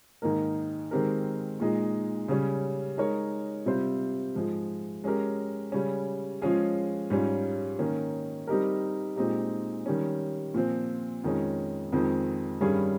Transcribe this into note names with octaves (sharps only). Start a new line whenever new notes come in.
G#2 D#3 A#3 D#4 A#4
D#3 G#3 C4 G4 A#4
A#2 G#3 D#4
C#3 G3 C#4
G#3 D#4 A#4 C#5
C3 G3 C4 F4 C5
G#2 F3 G#3
G#3 C#4 G4 A#4
C#3 G3 C#4
F3 G#3 C#4 F4 G#4
G#2 G3 C#4 F4
D#3 A#3 C#4
G3 C4 D#4 G4 A#4
A#2 G#3 C4 D#4 G4
D#3 G3 C#4
A#2 F3 C4
F2 D#3 G#3 C#4
F2 D#3 G#3 C4
G2 D#3 G3 C#4 G#4